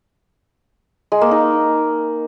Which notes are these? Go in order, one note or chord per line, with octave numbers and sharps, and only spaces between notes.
G#3
A#3
D#4